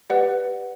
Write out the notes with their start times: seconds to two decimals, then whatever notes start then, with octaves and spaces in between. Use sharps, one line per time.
0.10 G4 B4 D5 F#5